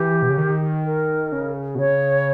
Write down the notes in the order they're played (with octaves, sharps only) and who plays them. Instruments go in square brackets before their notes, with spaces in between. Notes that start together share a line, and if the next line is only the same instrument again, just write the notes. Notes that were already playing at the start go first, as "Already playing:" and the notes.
Already playing: [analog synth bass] E3 [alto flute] G4
[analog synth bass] B2
C#3
D#3
[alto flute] A#4
[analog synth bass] C#3
B2
[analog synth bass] C#3 [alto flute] C#5